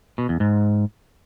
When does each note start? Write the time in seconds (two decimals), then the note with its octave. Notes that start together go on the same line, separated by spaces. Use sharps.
0.18 B2
0.29 E2
0.40 G#2